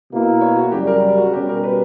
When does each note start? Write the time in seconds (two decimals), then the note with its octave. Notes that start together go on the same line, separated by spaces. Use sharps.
0.10 B2 A#3 E4
0.41 C#5
0.56 F#4
0.72 F#2 C#3 G3 G4
0.87 A#4
1.18 F#4
1.33 B2 G3 C#4 G4
1.49 A#4
1.64 B4